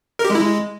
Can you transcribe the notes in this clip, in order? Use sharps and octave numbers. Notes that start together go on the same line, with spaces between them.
A#4
G4
G#3
E4
G#3